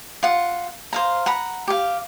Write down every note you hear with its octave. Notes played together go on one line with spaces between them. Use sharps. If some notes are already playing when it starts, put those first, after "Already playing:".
F4 F#5
C5 F5 A#5
F#5 A#5 B5
G4 F5